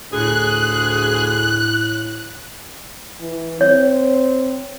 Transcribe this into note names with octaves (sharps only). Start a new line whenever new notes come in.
D2 A2 G#4 F#6
E3
C4 C#5